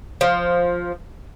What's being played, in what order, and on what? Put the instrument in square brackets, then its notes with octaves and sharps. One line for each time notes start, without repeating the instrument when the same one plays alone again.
[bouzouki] F3